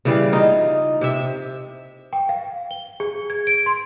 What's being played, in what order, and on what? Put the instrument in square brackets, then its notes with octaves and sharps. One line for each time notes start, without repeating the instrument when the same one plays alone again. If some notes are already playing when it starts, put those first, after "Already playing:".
[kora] C#3 E3 G3 F5
D#4 F4
C3 E5
[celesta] G5
F5
G7
G#4
G#6
D7
C6